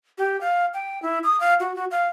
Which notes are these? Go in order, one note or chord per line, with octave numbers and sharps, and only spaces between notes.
G4
F5
G5
E4
D#6
F5
F#4
F#4
F5